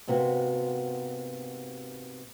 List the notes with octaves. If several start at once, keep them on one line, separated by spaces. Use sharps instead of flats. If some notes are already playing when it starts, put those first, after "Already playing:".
G#2 C3 A#3 B3 F#4